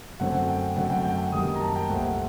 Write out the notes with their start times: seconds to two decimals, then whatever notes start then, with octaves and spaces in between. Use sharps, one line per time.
0.20 F#2 D3 A3 C4 F#5
0.49 G5
0.76 F#2 D3 A3 C4 F#5
0.90 G5
1.05 G5
1.32 F#2 D#3 G3 A#3 D#6
1.56 A#5
1.61 A5
1.76 G5
1.89 C2 A#2 A3 C4 F#5